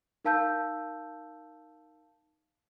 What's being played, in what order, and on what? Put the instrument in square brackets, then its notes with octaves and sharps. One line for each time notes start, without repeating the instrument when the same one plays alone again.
[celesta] D#4 A#4 F5 A5 E6 G6